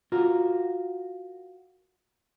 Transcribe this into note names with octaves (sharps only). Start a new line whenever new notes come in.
F4 F#4 A#4